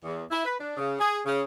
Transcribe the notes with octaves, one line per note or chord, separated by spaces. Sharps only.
E2
E4
B4
D4
C#3
G#4
C#3